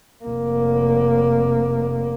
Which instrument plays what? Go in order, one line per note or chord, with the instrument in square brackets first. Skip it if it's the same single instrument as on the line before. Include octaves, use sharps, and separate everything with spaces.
[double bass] F1 A#3